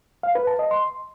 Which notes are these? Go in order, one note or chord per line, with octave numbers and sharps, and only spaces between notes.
F5
B4
A5
D#5
C6